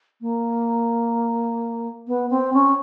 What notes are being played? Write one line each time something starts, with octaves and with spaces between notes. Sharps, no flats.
A#3
B3
C4
C#4